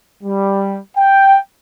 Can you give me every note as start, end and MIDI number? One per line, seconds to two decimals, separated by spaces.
0.23 0.78 55
0.97 1.38 79